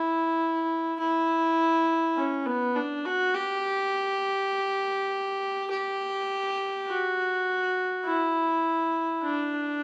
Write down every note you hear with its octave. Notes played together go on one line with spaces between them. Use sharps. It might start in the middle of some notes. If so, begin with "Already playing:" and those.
Already playing: E4
E4
C#4
B3
D4
F#4
G4
G4
F#4
E4
D4